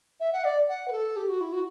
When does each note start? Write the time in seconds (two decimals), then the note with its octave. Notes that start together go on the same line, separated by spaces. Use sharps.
0.20 E5
0.33 F#5
0.44 D5
0.68 F#5
0.88 B4
0.92 A4
1.16 G4
1.28 F#4
1.41 E4
1.53 F#4